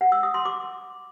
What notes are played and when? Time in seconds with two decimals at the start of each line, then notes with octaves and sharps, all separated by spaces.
0.01 F#5
0.12 E6
0.23 D#6
0.34 C6
0.45 D6